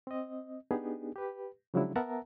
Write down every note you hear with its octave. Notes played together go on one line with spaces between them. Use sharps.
C4 D#5
B3 D4 D#4 G4 G#4
G4 B4
C#3 F3 F#3 G#3 D4 E4
B3 A#4 E5 F#5 A5 A#5